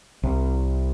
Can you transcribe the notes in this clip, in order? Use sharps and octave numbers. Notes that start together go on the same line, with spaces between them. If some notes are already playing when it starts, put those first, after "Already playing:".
C2